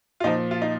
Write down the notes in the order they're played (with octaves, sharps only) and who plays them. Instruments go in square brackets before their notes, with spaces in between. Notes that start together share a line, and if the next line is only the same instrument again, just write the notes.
[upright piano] F4
A#2 F3 D#4
F4
D#4